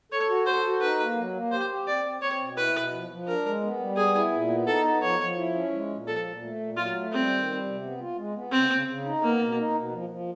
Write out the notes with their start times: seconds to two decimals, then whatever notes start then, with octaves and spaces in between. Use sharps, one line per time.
0.12 A4 C#5
0.29 F#4
0.46 A4 C5
0.64 F#4
0.81 D#4 B4
0.99 A#3
1.16 F#3
1.34 A#3
1.52 G4 C5
1.70 G4
1.87 C4 D5
2.05 C4
2.21 C4 C#5
2.39 B2
2.57 E4 B4
2.74 B2
2.92 F3
3.10 F3
3.27 D4 A#4
3.44 G#3
3.62 B3
3.79 G3
3.97 B3 G#4
4.14 E4
4.32 A#2
4.50 B3
4.67 D#4 A4
4.85 B3
5.02 F3 C#5
5.19 F3
5.36 E4
5.54 C#4
5.72 G#3
5.89 A#2
6.07 F3 A4
6.24 A#2
6.42 A3
6.60 A#2
6.77 F#3 F4
6.94 A3
7.12 G3 C4
7.29 D#3
7.47 G3
7.64 C3
7.82 B3
7.99 F4
8.17 G#3
8.34 B3
8.52 C#3 C4
8.70 C#3
8.87 C#3
9.05 D#4
9.22 A#3 B3
9.39 B2
9.57 D#4
9.74 B2
9.92 F3
10.09 F3